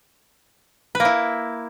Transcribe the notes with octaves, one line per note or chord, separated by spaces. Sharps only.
B4
A#3
E4